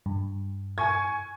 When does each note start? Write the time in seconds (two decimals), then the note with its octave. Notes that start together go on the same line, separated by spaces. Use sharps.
0.06 G2
0.78 G#5 C#6 G#6